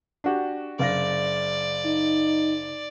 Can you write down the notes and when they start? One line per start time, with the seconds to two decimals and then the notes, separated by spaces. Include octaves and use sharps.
0.24 D4 F#4 G4
0.79 F#1 D5 F5 A#6
1.86 D#4